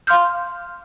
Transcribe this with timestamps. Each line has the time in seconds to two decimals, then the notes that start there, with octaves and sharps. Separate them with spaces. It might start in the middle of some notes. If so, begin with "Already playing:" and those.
0.07 F5 C6 D6 F6 G6